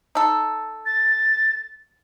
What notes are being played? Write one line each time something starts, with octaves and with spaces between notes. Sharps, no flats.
D#4 A4
A6